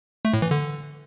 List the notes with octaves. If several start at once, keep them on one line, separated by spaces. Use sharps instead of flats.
A3
A2
E3
D3